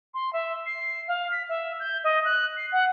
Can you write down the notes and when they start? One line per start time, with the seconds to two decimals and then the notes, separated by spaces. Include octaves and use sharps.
0.14 C6
0.33 E5
0.66 C7
1.07 F5
1.31 B6
1.49 E5
1.79 G6
2.03 D#5
2.24 F#6
2.57 C7
2.72 F#5